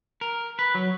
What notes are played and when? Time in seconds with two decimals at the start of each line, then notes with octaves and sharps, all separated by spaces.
0.21 A#4
0.59 B4
0.75 F#3